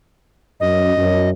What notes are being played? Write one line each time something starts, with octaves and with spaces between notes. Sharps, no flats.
F#2 D#5
F#2